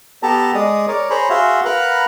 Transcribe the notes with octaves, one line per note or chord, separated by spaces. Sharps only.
B3 G4 A4 A5 A#5
G#3 G#4 D5 D#6
A#4 C#5 D5
G#4 C5 C#5 A#5 B5
F#4 G#4 E5 F5 C6
A#4 B4 F5 F#5 A#5 B5